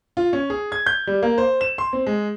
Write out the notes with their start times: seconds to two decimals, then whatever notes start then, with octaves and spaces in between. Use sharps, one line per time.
0.17 F4
0.33 C#4
0.50 G#4
0.72 G#6
0.86 G6
1.07 G3
1.23 A#3
1.38 C5
1.61 E7
1.78 C6
1.93 C4
2.07 G#3